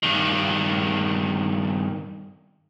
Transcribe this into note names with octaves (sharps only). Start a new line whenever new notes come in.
G2 D#3